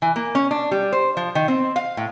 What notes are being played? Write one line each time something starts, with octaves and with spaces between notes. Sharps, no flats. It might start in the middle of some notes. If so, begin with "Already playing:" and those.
E3
A#3
C#4
D4
G3
C5
F3
D#3
C4
F5
A2